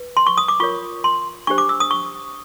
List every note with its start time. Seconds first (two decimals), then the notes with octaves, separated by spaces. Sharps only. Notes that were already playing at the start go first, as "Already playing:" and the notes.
Already playing: B4
0.17 C6
0.27 C#6
0.38 D#6
0.48 D6
0.60 F4 A#4 C#5 C#6
1.04 C6
1.47 D4 G4 C5 C#6
1.58 D6
1.69 E6
1.80 D#6
1.91 C#6